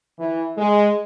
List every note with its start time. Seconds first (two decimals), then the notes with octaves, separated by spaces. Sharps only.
0.19 E3
0.58 G#3